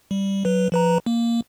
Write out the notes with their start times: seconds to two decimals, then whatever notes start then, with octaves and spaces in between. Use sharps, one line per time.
0.11 G3
0.45 F#3 B4
0.72 F3 B4 A#5
1.06 A#3